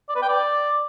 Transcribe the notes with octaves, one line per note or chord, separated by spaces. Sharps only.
D5
B4
G5
D5